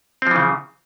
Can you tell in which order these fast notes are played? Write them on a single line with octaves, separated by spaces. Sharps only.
C4 F3 E3 C#3